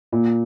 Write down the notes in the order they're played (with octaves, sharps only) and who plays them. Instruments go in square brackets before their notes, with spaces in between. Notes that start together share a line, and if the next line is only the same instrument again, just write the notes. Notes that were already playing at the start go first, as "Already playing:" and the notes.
[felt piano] A#2